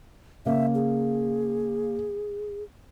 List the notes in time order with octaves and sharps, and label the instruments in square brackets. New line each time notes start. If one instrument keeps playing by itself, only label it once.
[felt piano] C#3 A#3 [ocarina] E5
[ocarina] G#4